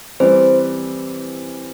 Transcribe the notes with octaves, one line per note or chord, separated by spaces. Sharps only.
E3 G3 C4 C5